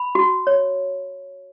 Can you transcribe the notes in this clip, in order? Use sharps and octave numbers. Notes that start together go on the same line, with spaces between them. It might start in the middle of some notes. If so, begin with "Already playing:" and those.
Already playing: B5
F#4
C#5